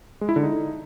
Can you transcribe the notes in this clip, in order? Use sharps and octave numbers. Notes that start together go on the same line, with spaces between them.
G#3
E4
D3
D#4